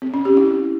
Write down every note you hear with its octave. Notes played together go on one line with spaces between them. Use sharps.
C4
C#4
G4
E4